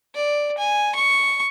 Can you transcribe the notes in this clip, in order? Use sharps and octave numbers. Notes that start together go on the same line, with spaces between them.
D5
G#5
C#6